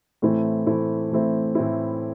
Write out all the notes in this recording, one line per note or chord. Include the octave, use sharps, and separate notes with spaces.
A2 E3 A3 C4 E4
A2 E3 A3 C4 E4
A2 E3 A3 C4 E4
A2 E3 A3 C4 E4